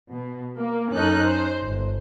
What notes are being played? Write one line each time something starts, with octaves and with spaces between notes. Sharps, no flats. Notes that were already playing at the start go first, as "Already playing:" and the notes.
B2
A#3
F#2 C#4 D#4 A4 F#6
C5
G1